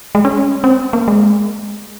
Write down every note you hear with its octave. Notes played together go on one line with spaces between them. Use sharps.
G#3
C#4
C4
A#3
G#3